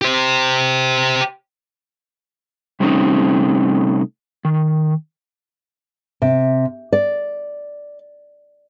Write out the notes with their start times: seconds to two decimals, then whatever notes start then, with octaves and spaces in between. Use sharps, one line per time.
0.02 G4 C5
2.80 C3 G3 A3 C4 C#4 D#4
4.45 D#3
6.22 C3
6.93 D5